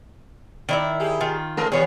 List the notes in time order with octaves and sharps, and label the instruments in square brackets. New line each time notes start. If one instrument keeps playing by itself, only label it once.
[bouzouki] D#3 E4 E5 [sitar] D5
[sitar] G4 G#4
[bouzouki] D#3 F4
[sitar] G#3 A4 A#4
[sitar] D#2 G3 B3 [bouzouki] G#4 C#5